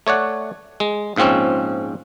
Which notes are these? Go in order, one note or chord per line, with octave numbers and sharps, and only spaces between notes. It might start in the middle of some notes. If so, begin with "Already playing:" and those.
A3 C#5 D5 F#5
G#3
A#1 G#2 F3 C4 C#4